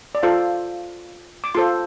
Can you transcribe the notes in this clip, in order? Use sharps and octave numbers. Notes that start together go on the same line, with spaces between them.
D5
F4 A4 C5 F5
D6
F4 A4 C5 C6